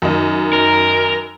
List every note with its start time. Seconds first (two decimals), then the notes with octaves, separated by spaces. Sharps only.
0.02 F#2 D#3 D#4
0.53 A#4